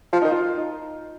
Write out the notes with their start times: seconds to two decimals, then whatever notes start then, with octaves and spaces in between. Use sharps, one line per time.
0.13 F3 F4
0.22 D#3 D#4
0.31 F4
0.58 D#4